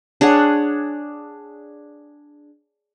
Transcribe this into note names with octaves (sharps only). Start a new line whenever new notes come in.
D4 G#4 C#5 F#5